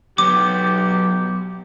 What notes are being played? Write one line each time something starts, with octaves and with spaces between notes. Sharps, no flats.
F#3 B3 G4 D6